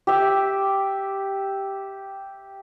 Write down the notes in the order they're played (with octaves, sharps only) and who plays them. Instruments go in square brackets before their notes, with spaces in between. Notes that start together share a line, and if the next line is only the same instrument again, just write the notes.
[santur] G4 E5